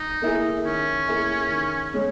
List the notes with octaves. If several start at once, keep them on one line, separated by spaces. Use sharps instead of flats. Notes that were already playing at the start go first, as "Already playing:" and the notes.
Already playing: D#4
A#3 E4 G#4
D#3 C#4
A#3 E4 G#4
D#3
G#3 C#4